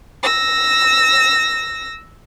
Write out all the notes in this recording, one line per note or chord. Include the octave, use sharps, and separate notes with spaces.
E6 A#6